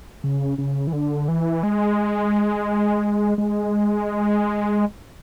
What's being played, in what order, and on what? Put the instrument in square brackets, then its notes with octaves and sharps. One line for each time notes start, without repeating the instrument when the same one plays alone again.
[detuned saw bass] C#3
C#3
E3
D3
E3
G#3
G#3